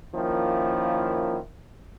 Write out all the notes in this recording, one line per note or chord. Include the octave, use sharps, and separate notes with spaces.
D#3 F3 A#3 C#4 E4 F4